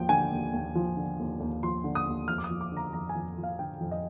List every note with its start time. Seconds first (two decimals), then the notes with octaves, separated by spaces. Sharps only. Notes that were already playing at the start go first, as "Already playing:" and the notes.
Already playing: D#2 F3 G5
0.09 D3 G#5
0.32 D#2
0.53 D#2
0.75 F3
0.97 D3
1.19 D#2
1.40 D#2
1.63 F3 C6
1.84 D3
1.95 D#6
2.06 D#2
2.28 F2 F6
2.38 D6
2.44 D#6
2.50 F3
2.61 D6
2.72 D3 A#5
2.93 F2 A#5
3.09 G#5
3.15 F2
3.38 F3
3.43 F5
3.59 D3 G5
3.80 F2
3.91 D#5